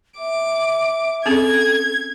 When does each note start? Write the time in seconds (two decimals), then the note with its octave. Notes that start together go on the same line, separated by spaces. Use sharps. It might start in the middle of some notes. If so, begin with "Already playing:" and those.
0.19 E5 D6
1.26 C4 C#4 G#4 A4 G#6